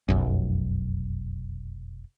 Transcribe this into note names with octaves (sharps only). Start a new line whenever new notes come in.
F1 B1 F#2